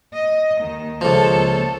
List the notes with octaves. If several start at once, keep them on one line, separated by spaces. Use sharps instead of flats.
D#5
D#2 D#3
C#2 F3 A#3 A4